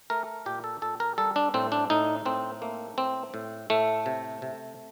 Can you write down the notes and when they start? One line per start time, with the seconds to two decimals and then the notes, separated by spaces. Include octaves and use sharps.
0.10 A3 A#4
0.46 A#2 G4
0.64 A4
0.82 A#2 A4
1.00 A#4
1.18 G3 A4
1.36 D4
1.54 A2 C4
1.72 D4
1.90 A2 D#4
2.25 A2 C4
2.62 A3 A#3
2.97 A2 C4
3.34 A2
3.70 A2 A3
4.06 C3
4.42 C3